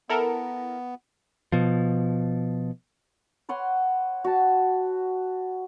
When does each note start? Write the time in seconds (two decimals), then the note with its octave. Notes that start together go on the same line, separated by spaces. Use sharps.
0.09 B3 E4 A4 A#4
1.52 B2 F3
3.49 B4 C#5 F#5 C6
4.24 F#4 A5